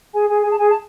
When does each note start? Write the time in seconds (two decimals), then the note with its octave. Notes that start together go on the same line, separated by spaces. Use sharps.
0.13 G#4 G#5
0.29 G#4 G#5
0.44 G#4 G#5
0.52 A5
0.59 G#4 G#5
0.70 A5